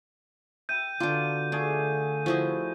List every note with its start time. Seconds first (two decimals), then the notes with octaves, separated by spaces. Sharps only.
0.69 E5 G5 B5 G6 D#7
1.00 B2 D3 D4 F4 A#5 D6
1.52 A3 D4 G#4 F5
2.26 F3 E4 F#4 G#4 D#5